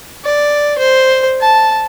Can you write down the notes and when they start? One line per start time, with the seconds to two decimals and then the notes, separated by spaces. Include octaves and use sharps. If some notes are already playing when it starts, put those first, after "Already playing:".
0.24 D5
0.78 C5
1.41 A5